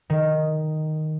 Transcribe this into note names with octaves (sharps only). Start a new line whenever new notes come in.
D#3